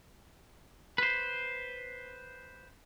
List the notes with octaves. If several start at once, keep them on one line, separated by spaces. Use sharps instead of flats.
B4 C5